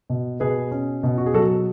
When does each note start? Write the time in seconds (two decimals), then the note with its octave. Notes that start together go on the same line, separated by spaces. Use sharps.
0.10 B2
0.40 B2 G#4 B4
0.71 C#4
1.03 B2
1.18 F#4
1.26 G#4
1.34 F#3 F#4 A4